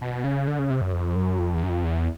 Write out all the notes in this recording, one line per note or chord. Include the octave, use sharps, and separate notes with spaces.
B2
C#3
D3
C#3
C3
F#2
F2
F#2
F2
E2
F#2
F2
E2